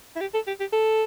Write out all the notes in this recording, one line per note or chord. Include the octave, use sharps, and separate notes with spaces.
E4
G4
A4
G4
G4
A4